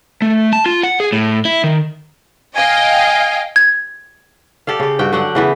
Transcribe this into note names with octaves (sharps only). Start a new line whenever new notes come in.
A3
A5
F4
F#5
G#4
A2
E4
D#3
D#5 F5 G5 G#5
G#6
G4 A4 D5 F5
C#3 G4
G2 F#4 G5
D3 F#3 F#5 G5
C#3 E3 B3